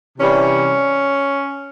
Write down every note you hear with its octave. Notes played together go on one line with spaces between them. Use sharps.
C3 E3 G3 C#4